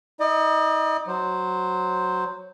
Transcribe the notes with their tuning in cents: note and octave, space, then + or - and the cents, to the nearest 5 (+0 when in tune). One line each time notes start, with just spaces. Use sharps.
D#4 +40 D#5 -45
F#3 +0 C5 +0